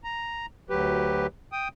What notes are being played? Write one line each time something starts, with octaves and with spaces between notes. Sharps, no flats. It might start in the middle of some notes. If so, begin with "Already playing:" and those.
A#5
D2 F#3 G4 B4
G5 D#6